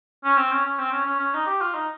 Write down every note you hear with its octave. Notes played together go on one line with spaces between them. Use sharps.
C#4
C4
C#4
C#4
C4
C#4
C#4
C#4
D#4
G4
F4
D#4